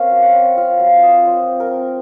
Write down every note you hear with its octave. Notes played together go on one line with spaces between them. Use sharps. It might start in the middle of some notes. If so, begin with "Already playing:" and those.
Already playing: A#3 C4 C#4 F5
F#3
F#5
C4
F4 F5
F#3 F5
F#3 D#5
F3 C5
C4
A#4
C4